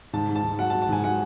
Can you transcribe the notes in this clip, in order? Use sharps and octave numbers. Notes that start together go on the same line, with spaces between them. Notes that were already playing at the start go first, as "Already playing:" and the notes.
G#2 A5
G#2
A5
G#2
F#3 F#5
A5
F#3
A5
G#2 G#5
F#3 F#5